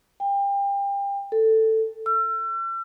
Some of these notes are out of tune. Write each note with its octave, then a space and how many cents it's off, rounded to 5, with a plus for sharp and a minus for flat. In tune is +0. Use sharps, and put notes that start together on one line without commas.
G5 +30
A4 +10
E6 +40